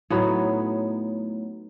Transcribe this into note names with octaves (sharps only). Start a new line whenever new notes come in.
A2 F#3 B3 D#4 C#5